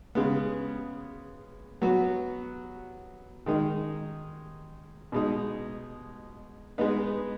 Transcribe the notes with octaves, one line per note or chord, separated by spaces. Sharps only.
C#3 G#3 B3
F#3 B3 F#4
D#3 G#3 D#4
B2 G#3 D#4
G#3 B3 D#4 B4